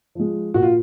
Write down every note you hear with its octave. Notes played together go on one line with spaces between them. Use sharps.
F3 G#3
A#2 F#4
F4